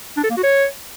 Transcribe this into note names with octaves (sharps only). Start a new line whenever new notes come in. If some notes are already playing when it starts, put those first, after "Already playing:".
D4
A4
A#3
F#4
C#5